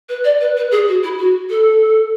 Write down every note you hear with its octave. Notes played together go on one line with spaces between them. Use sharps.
B4
D5
B4
B4
G#4
F#4
E4
F#4
A4